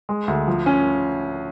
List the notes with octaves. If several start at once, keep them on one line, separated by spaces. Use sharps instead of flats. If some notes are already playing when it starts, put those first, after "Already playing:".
G#3
D2
F3
C#4